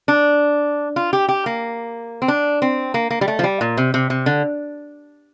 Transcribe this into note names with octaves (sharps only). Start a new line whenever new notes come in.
D4
F4
G4
G4
A#3
C4
D4
C4
A#3
A#3
G3
A3
F3
G3
A#2
C3
C3
C3
D3